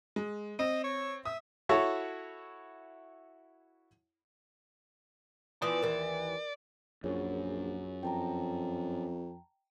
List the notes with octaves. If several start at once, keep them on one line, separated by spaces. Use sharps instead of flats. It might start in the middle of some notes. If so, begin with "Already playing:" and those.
G#3
C4 D#5
C#5
E5 D#6
E4 F#4 A4 C#5 E5 C#6
E3 F3 B3 D5 D#6
D#2 E3 A#4
A#1 F#2 F4 G#4 C#5
F2 G5 A5 A#5